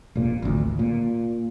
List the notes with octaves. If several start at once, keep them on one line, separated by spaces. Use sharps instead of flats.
E1 A#2
G#1 D2
A#2